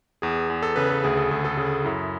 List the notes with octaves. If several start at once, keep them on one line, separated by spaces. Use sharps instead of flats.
E2 G#4
E2
A4
C#3 B4
A4
D2 G#4
A4
D2 G#4
A4
C#3 G#4
F#2 E4